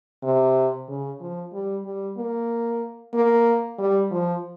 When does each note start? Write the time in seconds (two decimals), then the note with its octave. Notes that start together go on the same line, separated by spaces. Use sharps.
0.23 C3
0.88 C#3
1.20 F3
1.53 G3
1.85 G3
2.17 A#3
3.14 A#3
3.79 G3
4.11 F3